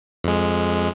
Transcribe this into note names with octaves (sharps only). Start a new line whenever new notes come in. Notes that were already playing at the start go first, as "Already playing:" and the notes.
F2 G#3